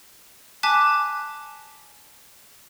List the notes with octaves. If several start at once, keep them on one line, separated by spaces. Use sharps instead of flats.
G#5 A5 D6 F#6 B6